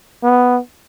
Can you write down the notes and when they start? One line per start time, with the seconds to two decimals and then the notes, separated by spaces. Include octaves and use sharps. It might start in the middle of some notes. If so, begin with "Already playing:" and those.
0.23 B3